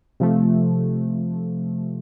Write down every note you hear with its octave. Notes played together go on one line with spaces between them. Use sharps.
C3 F3 A3